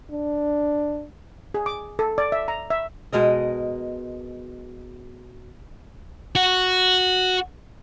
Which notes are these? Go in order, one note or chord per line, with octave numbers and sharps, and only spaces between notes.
D4
G#4
D6
A4
D5
E5
A#5
E5
B2 G#3 A#4 D#5
F#4